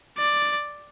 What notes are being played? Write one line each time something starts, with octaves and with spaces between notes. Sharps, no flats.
D5